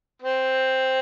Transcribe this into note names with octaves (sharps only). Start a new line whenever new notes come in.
C4